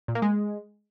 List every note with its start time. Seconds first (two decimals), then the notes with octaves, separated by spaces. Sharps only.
0.08 A#2
0.15 A#3
0.22 G#3